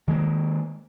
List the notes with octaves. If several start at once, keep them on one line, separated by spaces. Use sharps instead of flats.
D#3 G#3 A#3